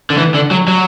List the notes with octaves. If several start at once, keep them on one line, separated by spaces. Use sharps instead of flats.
D3
E3
D3
F#3
F#3